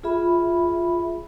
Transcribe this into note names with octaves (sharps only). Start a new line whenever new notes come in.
F4 G#4 E5 B5